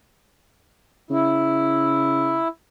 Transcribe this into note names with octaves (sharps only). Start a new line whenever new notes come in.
C#3 E4